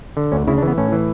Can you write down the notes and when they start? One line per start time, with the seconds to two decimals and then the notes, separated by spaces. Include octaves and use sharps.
0.17 D3
0.32 D2 C#4
0.48 C#3 E4
0.58 D4
0.62 E3
0.67 B3
0.78 A2 C#4
0.92 E3